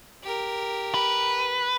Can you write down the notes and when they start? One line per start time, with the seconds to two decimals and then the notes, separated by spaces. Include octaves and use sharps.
0.23 G4 A#4
0.94 B4